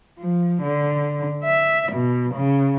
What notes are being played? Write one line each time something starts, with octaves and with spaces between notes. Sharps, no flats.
F3
D3
E5
B2
C#3